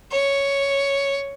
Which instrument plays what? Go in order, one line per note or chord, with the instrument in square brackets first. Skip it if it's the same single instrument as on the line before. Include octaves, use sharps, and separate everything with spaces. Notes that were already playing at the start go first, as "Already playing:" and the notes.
[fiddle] C#5